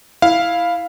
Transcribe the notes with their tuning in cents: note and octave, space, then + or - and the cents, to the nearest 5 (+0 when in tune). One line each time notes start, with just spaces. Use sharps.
E4 +0 F5 +0